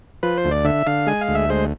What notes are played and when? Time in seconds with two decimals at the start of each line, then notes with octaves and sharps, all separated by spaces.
0.23 F3 B4
0.38 C5
0.44 D2
0.51 D5
0.65 D3 E5
0.87 D3 F5
1.07 G#3 G#5
1.21 F5
1.28 D2
1.35 E5
1.50 G#3 C5